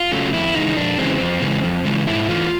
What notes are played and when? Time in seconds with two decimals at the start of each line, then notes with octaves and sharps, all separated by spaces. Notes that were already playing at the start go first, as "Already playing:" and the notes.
Already playing: F4
0.12 C#3 F#3 A3
0.33 F2 E4
0.55 C#3 E3 G#3 D#4
0.77 F2 D4
0.98 C#3 E3 G#3 C4
1.20 F2
1.42 C#3 E3 G#3
1.64 F2
1.85 C#3 E3 G#3
2.07 G#2 E4
2.29 E3 A3 F4